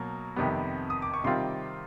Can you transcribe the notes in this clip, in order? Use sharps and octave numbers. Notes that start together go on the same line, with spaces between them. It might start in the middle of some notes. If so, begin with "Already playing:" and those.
Already playing: B2 F#3 A#3
F2 C3 D#3 G3 B3
D#6
D6
C#6
C3 D#3 G3 C4 F4 C6